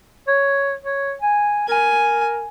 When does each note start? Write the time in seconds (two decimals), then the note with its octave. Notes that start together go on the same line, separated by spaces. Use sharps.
0.28 C#5
0.83 C#5
1.22 G#5
1.68 A#4 G#5